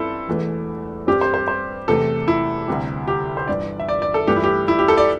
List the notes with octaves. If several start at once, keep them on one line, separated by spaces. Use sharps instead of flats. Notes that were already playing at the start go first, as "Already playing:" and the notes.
Already playing: G2 C4 E4 A4
E1 E2 E3 A3
G2 G3 C4 G4
C5
C5
C5
E2 C3 A3 A4
E4
D2 C3 G3
G4
C5
G1 G2 E3 D5
E5
D5
D5
A4
G2 E3 A3 G4
E4
G4
E4
G4
A4
D5